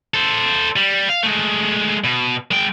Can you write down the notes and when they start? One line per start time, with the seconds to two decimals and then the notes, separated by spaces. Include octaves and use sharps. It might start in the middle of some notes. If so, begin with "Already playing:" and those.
0.14 A4 C5
0.76 G3
1.09 F5
1.23 G#3 A3
2.04 B2
2.51 G#3 G5